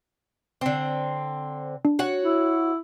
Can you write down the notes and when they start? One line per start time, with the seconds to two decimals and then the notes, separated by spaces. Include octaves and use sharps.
0.61 D3 C4
1.85 D4
1.99 F#4 C#5 F#5
2.23 E4